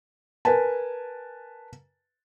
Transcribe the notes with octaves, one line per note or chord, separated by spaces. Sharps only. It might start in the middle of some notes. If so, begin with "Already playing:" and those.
A#4 B4 G#5 A5